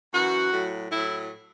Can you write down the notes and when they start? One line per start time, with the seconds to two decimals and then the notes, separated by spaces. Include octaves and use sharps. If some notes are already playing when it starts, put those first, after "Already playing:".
0.13 F#2 E3 F#4
0.52 A2 F#3
0.90 A2 F#3 E4